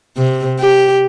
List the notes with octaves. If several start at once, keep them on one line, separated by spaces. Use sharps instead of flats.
C3
G4